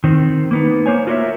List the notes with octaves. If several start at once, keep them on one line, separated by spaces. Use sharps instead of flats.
D#3 C4
A#3 B3 D#4
A#3 C5 C#5 G#5
F4 F#4 A#4 C5 C#5 E5